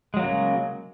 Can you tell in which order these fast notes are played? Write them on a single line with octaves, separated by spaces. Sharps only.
G#3 F#3 A#3 C#3